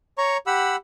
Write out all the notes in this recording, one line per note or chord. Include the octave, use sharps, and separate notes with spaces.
C#5 A#5 C#6
G4 F#5 B5 E6